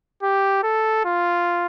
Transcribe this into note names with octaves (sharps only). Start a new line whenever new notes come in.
G4
A4
F4